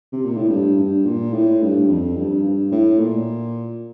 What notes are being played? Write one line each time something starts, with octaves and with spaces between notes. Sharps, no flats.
C3
A#2
A2
G2
G2
A#2
A2
G2
F2
G2
G2
A2
A#2